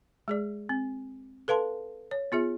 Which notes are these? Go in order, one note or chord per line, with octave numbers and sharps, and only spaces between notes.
G#3 G#4 D5
C4
A4 B4 F5 A5 C6
C#5
B3 F4 G#4 E5